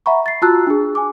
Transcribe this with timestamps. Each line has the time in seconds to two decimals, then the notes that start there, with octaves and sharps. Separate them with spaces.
0.06 E5 F#5 A#5 B5 C#6
0.26 A6 C7
0.42 F4 F#4 A5 A#5 E6 F#6
0.67 D4 G#4
0.95 G#5 D6